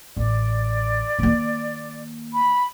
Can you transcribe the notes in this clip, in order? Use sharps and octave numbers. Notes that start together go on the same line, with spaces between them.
A1 D5
D#3 A#3
B5